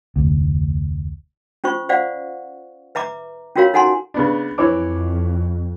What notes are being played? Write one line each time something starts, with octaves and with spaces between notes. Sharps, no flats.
F1 D2
C#4 F4 C5 C#6
C5 D5 F5 F#5
B4 E5 A#5 D6
C#4 F4 F#4 A#4 C#5 F5
D#4 A4 F#5 G#5 A#5 C6
C#3 B3 D4
F2 E3 C#5 D6